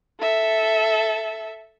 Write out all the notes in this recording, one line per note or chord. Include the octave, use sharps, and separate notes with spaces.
A4 E5